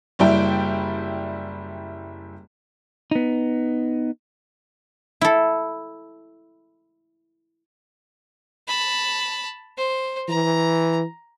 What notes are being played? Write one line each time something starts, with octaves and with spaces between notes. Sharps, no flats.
F#1 G3 E4 G5
B3 D#4
E4 A4
A5 B5
C5
E3 A#5